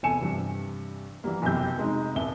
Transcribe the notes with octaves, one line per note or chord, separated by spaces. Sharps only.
F1 E2 A4 G#5 C#7 E7
G2 C3 E3
E3 F#3 G3 A#3
F1 B1 F#2 E4 G4 G6
F1 G#3 D#4
D#1 C2 E5 G7